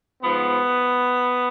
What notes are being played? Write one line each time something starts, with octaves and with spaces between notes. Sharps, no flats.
G#2 F3 B3